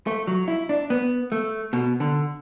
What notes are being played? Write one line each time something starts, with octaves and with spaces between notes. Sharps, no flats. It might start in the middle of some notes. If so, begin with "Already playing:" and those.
A3
F#3
E4
D4
B3
A3
B2
D3